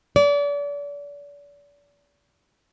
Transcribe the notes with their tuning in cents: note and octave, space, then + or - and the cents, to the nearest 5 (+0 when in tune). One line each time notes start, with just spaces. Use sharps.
D5 -35